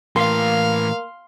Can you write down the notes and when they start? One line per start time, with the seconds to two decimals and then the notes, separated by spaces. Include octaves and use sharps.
0.16 A2 E3 A#3 F5 C6